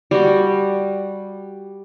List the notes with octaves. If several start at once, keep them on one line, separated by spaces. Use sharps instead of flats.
G3 F#4